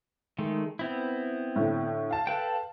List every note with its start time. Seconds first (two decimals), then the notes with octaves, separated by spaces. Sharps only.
0.38 D#3 G#3 A3
0.79 B3 C4 E4
1.56 A2 D3
2.11 F5 A5
2.27 A4 B4 G5